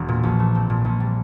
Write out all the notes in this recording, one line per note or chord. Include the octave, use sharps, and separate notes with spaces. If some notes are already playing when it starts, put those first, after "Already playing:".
Already playing: E1
A#2
A#1
A3
C4
A#2
A#1
G3